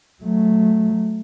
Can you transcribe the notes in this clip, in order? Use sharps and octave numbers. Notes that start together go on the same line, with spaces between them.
F#3 A3